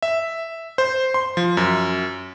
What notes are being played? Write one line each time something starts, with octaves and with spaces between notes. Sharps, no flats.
E5
C5
C6
F3
F#2